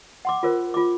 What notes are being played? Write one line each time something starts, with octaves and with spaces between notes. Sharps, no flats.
F#5 C6 D6
F4 A#4 C5
F4 D6